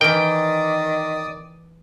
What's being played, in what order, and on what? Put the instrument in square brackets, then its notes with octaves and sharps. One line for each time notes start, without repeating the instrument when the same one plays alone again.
[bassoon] D#3 [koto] E3 A#4 [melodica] D5 D6 D#6 [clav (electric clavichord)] G5